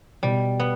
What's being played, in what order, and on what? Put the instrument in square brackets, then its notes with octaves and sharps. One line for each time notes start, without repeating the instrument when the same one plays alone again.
[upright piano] B2 [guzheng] G3
[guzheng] B3